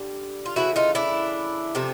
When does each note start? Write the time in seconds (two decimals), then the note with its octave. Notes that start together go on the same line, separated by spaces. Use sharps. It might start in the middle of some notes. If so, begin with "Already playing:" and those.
Already playing: D3 G3
0.46 F4
0.56 C#3 E3 A3 E4 F#4
0.76 D#4 F4
0.95 D4 E4
1.75 C3 F3 A3